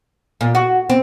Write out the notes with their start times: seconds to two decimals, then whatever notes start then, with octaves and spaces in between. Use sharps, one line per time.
0.41 A#2
0.55 F#4
0.90 C4